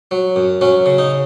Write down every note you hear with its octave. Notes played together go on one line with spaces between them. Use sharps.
F#3
F#2
F#3 C#4
C#3
D#4